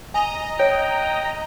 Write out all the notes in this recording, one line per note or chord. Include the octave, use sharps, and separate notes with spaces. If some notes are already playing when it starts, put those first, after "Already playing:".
D#5 G#5 A#5
C#5 G5